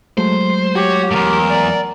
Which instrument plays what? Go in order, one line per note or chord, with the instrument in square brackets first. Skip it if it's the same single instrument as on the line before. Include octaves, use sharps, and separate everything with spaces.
[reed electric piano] F#3 G#3 A3 [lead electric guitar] C5
[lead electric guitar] F#4 [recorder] G4 [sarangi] C#5
[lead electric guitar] E2 G#2 [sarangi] A#4
[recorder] D5